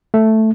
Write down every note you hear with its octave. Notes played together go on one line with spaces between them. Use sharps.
A3